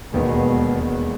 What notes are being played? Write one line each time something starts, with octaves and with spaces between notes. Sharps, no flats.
E1 D#2 B2 D#3 G#3 B3